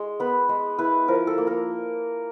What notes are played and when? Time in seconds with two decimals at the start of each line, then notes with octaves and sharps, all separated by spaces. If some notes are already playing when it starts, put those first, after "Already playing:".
Already playing: G#3
0.20 B3 B4
0.49 G#3
0.78 E4 B4
1.08 F3 A#4
1.27 A4
1.38 A#3
1.47 A#4